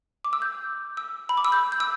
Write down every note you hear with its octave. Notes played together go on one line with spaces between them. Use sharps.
D6
E6
G6
E6
B5
D6
E6
G6
G6
E6